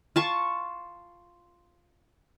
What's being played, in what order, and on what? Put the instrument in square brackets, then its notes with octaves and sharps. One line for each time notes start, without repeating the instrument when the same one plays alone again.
[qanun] F4 A5 C#6